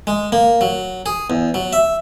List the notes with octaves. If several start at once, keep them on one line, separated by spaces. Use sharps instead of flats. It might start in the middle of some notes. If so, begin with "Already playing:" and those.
G#3
A#3
F#3
G#4
E2
F#3
E5